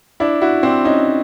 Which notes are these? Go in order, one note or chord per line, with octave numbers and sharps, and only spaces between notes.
D4 E4
E4 F#4
C4 D4
C#4 D#4